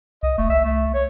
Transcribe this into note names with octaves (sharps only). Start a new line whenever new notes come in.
C2 D#5
E1 A3
C2 E5
A3
C#5